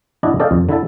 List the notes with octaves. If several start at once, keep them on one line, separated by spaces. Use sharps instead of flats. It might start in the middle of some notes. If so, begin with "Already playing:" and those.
D4 E4 F#4 D5 D#5
A4 D5 D#5 F5 G5
F2
D3 E4 E5 A5